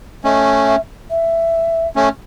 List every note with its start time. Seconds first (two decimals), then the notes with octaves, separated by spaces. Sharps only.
0.24 A3 C#4 D#5
0.67 E5
1.10 E5
1.96 A3 C#4